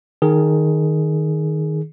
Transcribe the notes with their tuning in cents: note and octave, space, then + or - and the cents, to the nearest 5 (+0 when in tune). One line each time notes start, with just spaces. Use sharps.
D#3 +0 G#4 +10